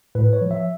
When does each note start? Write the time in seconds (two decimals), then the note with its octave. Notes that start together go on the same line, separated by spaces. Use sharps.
0.15 A2 B4
0.33 C#5
0.41 F3
0.51 E5